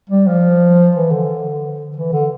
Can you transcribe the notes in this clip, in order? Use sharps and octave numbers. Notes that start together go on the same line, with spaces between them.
G3
F3
E3
D3
E3
D3